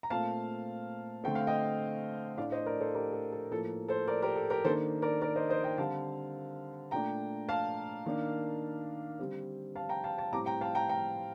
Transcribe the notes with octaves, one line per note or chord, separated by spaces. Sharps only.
A#5
A#2 A3 C4 F5 A5
D3 A3 C4 G5
F5
D#5 G5
A2 A3 D4 D5 F5
C5 D#5
A#4 D5
A4 C5
G4 A#4
A4
A4
A2 F3 A#3 A4
A4 C5
A#4 D5
G4 A#4
A4
G4 A#4
D#3 A#3 D4 A4 C5
A#4 D5
A#4 D5
C5 D#5
C5 D#5
D#5 G5
D3 G3 C4 F5 A5
A#2 A3 D4 G5 A#5
F5 A5
D#3 A#3 D4
D3 G3 C4
F5 A5
G5 A#5
F5 A5
F5 A5
A2 G3 C4 A#5 D6
G5 A#5
F5 A5
G5 A#5
G5 A#5